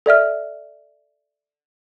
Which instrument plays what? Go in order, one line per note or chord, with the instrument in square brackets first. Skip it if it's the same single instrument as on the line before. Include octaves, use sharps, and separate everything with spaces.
[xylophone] A4 D5 E5 F6